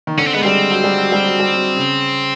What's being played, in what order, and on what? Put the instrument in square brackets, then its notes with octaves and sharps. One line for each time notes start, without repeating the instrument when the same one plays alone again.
[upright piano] D#3
[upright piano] D3 [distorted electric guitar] C#4
[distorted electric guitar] C4
[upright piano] G#3 [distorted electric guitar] B3
[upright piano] G3 [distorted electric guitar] C4
[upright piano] F#3
G3
F#3
G3
F#3
G3
F#3
C#3